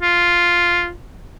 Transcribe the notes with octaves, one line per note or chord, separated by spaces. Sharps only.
F4